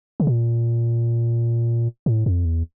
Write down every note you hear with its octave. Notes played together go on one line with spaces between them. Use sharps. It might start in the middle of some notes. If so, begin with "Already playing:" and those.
C#3
A#2
A2
F2
E2